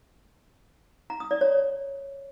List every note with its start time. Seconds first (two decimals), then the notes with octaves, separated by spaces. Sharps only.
1.10 A#5
1.20 D#6
1.31 D5
1.41 C#5